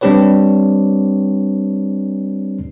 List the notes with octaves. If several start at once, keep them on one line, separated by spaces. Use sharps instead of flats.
G3 C4 D4 G4 B4 C#5